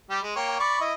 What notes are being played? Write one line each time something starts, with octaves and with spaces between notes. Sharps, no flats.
G3 G4
G#3
A#3 C#5 G5
D5 B5 C#6
E4 D#5